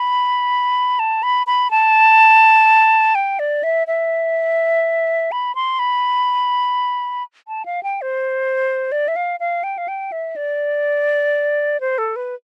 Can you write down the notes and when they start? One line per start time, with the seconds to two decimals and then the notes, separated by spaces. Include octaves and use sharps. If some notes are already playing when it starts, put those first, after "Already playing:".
Already playing: B5
0.99 A5
1.23 B5
1.47 B5
1.71 A5
3.15 G5
3.39 D5
3.63 E5
3.87 E5
5.32 B5
5.55 C6
5.79 B5
7.48 A5
7.66 F5
7.83 G5
8.02 C5
8.92 D5
9.08 E5
9.16 F5
9.40 F5
9.64 G5
9.78 F5
9.88 G5
10.12 E5
10.36 D5
11.80 C5
11.98 A4
12.16 B4